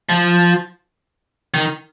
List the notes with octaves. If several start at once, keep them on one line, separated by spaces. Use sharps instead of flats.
F3
D#3